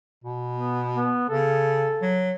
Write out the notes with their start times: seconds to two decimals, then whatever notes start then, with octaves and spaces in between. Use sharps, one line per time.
0.24 B2
0.54 B3
0.96 B3
1.29 C#3 A4
2.02 F#3